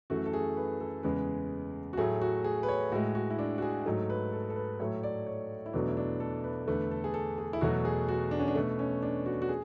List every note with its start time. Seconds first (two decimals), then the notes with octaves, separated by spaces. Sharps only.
0.10 F#2 E3 A3 F#4
0.26 A4
0.33 G#4
0.57 B4
0.80 A4
1.03 E2 C#3 G#3 B4
1.93 F#4
1.98 A2 F#3 A3 G#4
2.21 F#4
2.44 G#4
2.63 B4
2.68 C#5
2.92 A2 G#3 F#4
3.15 F#4
3.30 E4
3.39 D4
3.58 F#4
3.62 G#4
3.86 G#2 F#3 A3
4.10 B4
4.33 A4
4.50 A4
4.56 B4
4.80 A2 F#3 A3 C#5
5.03 D5
5.26 C#5
5.66 E4
5.73 E2 B2 F#3 A3 D4
5.88 E4
5.97 D4
6.20 A4
6.44 B4
6.68 E2 D3 A3 B4
6.91 A4
7.04 G#4
7.14 A4
7.38 G#4
7.53 E4
7.61 E2 B2 F#3 A3 F#4
7.85 G#4
8.08 F#4
8.31 D4
8.40 C#4
8.48 D4
8.55 B2 A3
8.79 C#4
9.02 D4
9.26 F#4
9.42 F#4
9.49 G#4